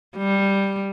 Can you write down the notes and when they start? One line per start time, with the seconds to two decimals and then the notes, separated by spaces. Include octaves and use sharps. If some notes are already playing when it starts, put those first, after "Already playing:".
0.17 G3